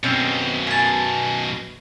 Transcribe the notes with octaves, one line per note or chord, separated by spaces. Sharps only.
F#2 B2 C4 C#4
G#5 A5